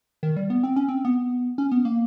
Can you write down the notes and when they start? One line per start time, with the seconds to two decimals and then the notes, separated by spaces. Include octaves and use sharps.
0.23 D#3
0.37 G3
0.50 B3
0.64 C4
0.76 C#4
0.89 C4
1.05 B3
1.58 C#4
1.71 B3
1.85 A#3